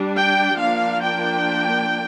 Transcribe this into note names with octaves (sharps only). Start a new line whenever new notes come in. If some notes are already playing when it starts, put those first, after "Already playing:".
Already playing: G3 D4
G5
F3 A#3 D4 F5
G5